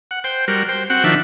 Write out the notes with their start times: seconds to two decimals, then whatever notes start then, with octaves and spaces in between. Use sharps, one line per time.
0.11 F#5
0.24 C5 G5
0.48 G3 F#4 A#4
0.69 C5 G5
0.90 C4 F#4 F#5
1.04 D#3 F3 D4 F#4 E5